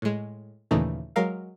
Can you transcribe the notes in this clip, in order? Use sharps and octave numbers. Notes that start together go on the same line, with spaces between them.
A2 G#3
D#2 A#2 C#3 E3 A3 D#4
F#3 G#3 A#4 F5